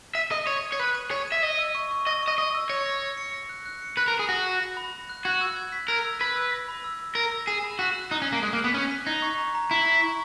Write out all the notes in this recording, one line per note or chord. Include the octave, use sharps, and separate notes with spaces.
E5 D#7
D#5 D#6
C#5 D#7
D#7
C#5
B4 D#7
D#7
C#5 G#6
E5 D#7
D#5 A#6
E6
C#6
C#6
D#5 A#6
D#5 C#6
D#5 A#6
E6
C#5 A#6
A#6
A#6
C#7
A#6
F#6
F#6
C#7
B4 A#6
A#4
B5
G#4
F#4 F#6
A#6
A#6
B5
B5
F#6
F#4 G#6
E6
G#6
B6
A#4 G#6
E6
B4 G#6
E6
A#6
B5
E6
E6
A#4 A#6
E6
G#4 E7
B5
F#4 B6
F#6
D#4 F#6
C#4
B6
A#3
G#3 F#6
A#3
F#7
B3
C#4 F#6
B6
D#4 G#6
C#6
A#5
A#5
E4 A#5
A#5
C#6